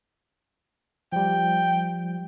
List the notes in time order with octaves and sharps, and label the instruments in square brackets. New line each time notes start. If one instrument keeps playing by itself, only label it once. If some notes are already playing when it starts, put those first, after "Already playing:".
[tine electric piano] F3 G3 [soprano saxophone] G5